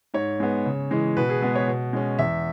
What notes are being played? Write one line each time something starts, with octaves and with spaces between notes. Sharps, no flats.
G#2 C#5
G#3 B3
C#3
E3 G#3 C#4
B2 B4
G#4
G#3 B3 G#4
C#5
B2
G#3 C#4
E2 E5